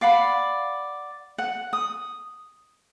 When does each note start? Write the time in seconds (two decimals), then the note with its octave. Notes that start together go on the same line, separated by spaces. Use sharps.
0.01 D5 F5 F#5 B5
1.38 F#5
1.73 D#6